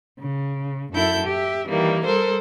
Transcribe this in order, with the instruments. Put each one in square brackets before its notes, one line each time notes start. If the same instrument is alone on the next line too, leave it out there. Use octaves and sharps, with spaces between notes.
[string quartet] C#3
F#2 E4 A4 G6
G4 E5
D#3 E3 G3 A#3
G3 A4 A#4 C5